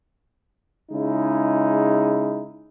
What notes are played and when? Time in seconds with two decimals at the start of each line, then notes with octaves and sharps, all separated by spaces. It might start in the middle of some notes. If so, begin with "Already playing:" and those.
0.91 C#3 G#3 D#4 E4